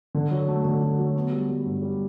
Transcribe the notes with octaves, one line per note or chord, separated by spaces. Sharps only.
D3
F#3
A3
D3
F#3
F#3
B3
G3
G3
G2
G3